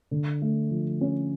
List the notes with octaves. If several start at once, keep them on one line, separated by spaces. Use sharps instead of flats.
D3
A3
F3
C#4